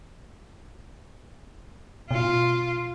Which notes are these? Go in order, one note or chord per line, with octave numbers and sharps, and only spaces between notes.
B2 F4